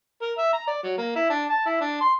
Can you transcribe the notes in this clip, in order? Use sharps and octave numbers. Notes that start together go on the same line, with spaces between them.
A#4
E5
A#5
D5
F#3
A#3
E4
D4
A5
E4
D4
C6